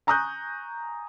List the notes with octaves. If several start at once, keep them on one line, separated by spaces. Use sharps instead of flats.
G#5 A#5 C#6 D#6 F#6 G6